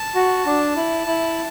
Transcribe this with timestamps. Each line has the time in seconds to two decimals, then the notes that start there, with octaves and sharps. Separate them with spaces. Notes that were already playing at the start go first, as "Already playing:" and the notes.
Already playing: A5
0.15 F#4
0.46 D4
0.76 E4
1.06 E4